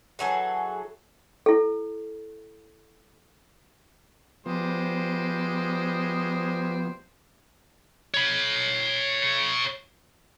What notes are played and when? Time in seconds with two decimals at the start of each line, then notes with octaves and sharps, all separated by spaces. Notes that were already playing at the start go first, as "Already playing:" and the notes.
0.19 E3 F#3 G#4 A4
1.46 E4 A4
4.46 F3 G3 G#3 B3 C5
8.14 C#5 B5